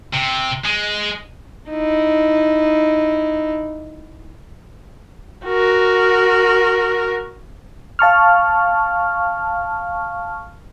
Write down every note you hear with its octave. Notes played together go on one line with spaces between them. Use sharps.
C3
G#3
D#4 E4
F#4 A#4
F5 A5 C#6 F6